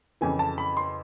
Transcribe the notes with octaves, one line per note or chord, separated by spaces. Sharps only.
F2 C#3 E3 G#5
A5
B5
C6